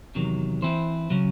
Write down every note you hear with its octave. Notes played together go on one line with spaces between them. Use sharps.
E2 C3 D#3 F#3
E3 C4 E4 C5
C#3 F#3 C#4